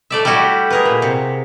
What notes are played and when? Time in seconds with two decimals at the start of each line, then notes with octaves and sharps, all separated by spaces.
0.10 A3 D5 E5
0.25 G3 A3 E4 F#4 G4
0.70 G#4 A#4 B4
0.85 A#2
1.02 C3